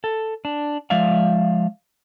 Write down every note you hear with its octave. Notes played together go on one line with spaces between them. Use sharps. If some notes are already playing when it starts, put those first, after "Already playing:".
A4
D4
F3 G#3 D5 E5 F5